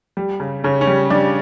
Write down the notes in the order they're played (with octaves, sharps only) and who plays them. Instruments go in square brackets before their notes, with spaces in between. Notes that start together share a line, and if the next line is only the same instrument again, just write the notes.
[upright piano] G3
C#3
C#3 C#4
C#4
G3
G3 D4